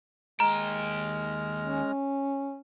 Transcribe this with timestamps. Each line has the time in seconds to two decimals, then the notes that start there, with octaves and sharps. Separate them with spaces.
0.40 D#2 G#3 G5 A#5 F6
1.61 C#4